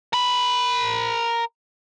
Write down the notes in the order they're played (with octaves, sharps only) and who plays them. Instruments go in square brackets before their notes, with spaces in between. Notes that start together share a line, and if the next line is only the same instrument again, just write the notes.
[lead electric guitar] A#4 B5